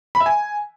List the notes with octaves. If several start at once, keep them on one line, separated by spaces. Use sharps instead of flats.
B5
E5
G#5